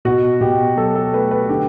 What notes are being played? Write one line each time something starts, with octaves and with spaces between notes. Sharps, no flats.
B2 F#4
B2 G4
F#3 A4
A4
A3 B4
B4
D3 G4